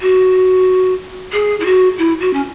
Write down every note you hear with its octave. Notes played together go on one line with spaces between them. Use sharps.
F#4
G#4
E4
F#4
E4
F#4
C#4